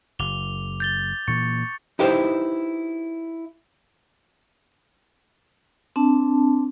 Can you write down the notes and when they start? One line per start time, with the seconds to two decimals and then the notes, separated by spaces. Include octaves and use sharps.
0.19 F#1 D6 F7 G7
0.80 G6 A6 G7
1.28 A#2 E3 A#3 C#6 A6 C#7
1.99 D#4 E4 G4 B4 C5
5.96 C4 D4 A5